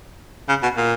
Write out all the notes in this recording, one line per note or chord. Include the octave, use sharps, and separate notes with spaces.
C#3
B2
A#2